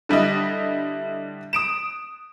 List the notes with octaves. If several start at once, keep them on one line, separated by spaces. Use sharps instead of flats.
D3 G3 E4 D#5
D#6 D7 E7